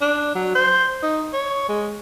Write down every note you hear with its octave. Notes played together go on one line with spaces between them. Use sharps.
D4
F#3
C5
D#4
C#5
G#3